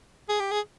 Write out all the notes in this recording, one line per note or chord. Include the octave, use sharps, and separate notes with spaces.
G#4
G4
G#4